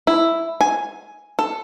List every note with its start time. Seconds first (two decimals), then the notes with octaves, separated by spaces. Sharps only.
0.07 E4
0.61 G#5
1.39 A4